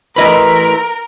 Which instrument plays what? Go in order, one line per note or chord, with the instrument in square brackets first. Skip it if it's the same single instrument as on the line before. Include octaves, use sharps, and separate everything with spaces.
[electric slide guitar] A3 E4 B4 [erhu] A#4 [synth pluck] D#5 B5